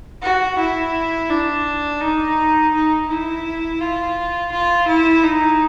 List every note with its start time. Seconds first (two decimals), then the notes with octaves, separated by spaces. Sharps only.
0.22 F#4
0.58 E4
1.30 D4
2.01 D#4
2.73 D#4
3.08 E4
3.81 F4
4.51 F4
4.88 E4
5.24 D#4